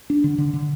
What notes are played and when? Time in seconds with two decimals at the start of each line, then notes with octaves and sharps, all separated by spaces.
0.10 D4
0.24 D3
0.38 D3
0.53 D3